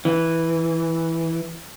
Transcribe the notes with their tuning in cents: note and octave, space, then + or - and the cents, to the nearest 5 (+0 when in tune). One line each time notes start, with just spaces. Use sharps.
E3 -5